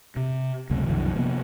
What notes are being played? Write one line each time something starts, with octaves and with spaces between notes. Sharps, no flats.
C3
C#2 F#2 C3 A3
C2 F#2 D#3 F3
C3 F3 A#3 B3